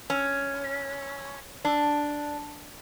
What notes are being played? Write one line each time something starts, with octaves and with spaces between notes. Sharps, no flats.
C#4
D4